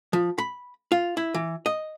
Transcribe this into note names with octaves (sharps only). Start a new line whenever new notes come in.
F3
B5
F4
E4
E3
D#5